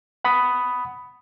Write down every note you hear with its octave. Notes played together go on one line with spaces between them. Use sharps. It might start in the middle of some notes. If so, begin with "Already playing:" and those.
F#5 B5 D#6